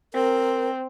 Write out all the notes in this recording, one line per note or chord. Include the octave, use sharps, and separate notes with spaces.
C4 A#4